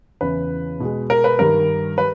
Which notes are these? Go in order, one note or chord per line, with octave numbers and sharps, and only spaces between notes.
E2 C#3 E3 B4
B2 G#3
A#4
B4
G2 D#3 G3 A#4
G3 B4